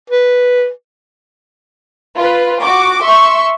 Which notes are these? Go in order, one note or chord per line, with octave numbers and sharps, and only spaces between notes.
B4
F4 B4
F#4 D6
E5 C6 C#6